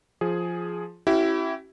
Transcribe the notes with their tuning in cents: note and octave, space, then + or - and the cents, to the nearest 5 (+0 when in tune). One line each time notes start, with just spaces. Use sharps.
F3 +0 G#4 +5
C#4 -30 E4 +5 G4 -40